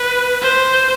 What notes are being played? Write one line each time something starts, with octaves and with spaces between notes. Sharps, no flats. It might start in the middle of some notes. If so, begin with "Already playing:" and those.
Already playing: B4
C5